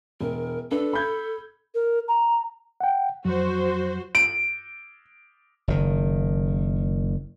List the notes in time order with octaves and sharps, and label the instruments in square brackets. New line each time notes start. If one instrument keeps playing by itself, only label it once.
[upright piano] E1 [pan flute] A#4
[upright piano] D4 B4 [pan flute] A4
[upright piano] B5 G6 G#6
[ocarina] A#4
A#5
[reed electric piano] F#5 G5
[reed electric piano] F2 F#3 [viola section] F#4 C5
[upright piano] D7
[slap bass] F#1 D#3